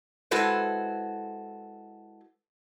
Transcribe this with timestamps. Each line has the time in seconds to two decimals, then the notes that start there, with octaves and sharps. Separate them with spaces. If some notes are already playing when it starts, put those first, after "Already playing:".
0.31 G#3 E4 F#4 A4 B4 C5